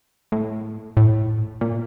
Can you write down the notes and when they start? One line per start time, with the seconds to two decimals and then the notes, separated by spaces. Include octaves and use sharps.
0.32 A2
0.97 A2
1.61 A#2